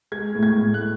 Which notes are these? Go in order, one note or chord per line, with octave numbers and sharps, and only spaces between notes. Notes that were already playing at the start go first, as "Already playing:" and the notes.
G#3 G#6
A2
G#6
A2
F#6